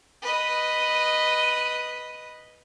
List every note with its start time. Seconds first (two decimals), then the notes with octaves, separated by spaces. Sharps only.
0.22 B4 D#5